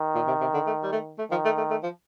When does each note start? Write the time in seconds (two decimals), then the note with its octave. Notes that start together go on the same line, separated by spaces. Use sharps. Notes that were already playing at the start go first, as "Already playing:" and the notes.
Already playing: D#3
0.15 A#2
0.27 C3
0.41 C3
0.54 D3
0.67 A3
0.83 G3
0.92 A3
1.19 A3
1.31 D#3 F3
1.45 A3
1.58 A3
1.70 A3
1.83 F3